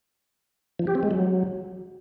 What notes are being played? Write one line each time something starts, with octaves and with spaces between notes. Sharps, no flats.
F3
G4
C4
G#3
F#3